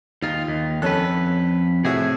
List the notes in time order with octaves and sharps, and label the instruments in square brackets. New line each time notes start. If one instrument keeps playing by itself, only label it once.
[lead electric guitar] D#2 F4 [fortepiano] D#4
[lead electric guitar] D#2
[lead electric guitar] F2 B4 [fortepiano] C#4 A4 F#6
[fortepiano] A2 F#4 E5 [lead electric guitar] C3 G#4